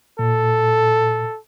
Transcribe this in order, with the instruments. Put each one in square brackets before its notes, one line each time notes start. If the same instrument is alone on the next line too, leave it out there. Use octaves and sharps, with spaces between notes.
[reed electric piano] A#2 [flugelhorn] A4